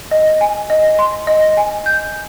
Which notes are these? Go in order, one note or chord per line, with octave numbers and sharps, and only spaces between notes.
D#5
G#5
D#5
C6
D#5
G#5
G6